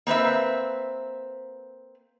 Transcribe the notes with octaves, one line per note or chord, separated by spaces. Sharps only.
A#3 C4 B4 E5